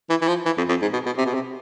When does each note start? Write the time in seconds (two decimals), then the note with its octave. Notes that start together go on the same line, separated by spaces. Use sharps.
0.09 E3
0.21 E3
0.28 F3
0.45 E3
0.57 F2
0.69 F2
0.82 G#2
0.93 B2
1.06 B2
1.17 C3
1.26 B2
1.34 C3